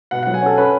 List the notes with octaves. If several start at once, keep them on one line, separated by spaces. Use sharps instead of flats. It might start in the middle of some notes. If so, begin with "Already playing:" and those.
B2 F#5
F#3 F#5
G#5
C#4 A4
C#4 B4